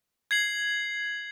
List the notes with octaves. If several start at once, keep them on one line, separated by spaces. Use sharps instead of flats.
G#6 C7 F#7